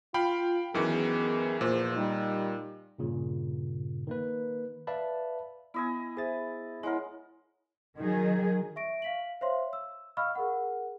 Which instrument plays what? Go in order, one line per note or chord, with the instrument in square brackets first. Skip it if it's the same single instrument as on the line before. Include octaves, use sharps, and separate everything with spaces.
[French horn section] F4 [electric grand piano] F5 G5 B5
[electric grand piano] F#2 D#3 E3 [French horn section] B3 G#4
[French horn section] E2 F3 C5 [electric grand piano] A#2
[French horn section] G3 D#4
[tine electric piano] G2 A#2 C#3
D#3 A#3 B4
B4 D5 E5 F5 A5 B5
[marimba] B3 [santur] E4 D#5 G#5
[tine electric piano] G#4 A6 [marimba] C5 E5
[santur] G#3 A#4 [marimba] E4 C#5 F#5
[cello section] D#3 F#3 G#4
[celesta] E5 C#6 A#6 D7
F5 B6 F#7
C5 C#5 E5 F5 C6
E6
D#5 F5 B5 C#6 E6 F6
G#4 A#4 F#5